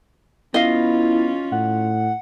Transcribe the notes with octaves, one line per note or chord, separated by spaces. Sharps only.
B3 C#4 E4 F4 D#5 F5
A2 F#5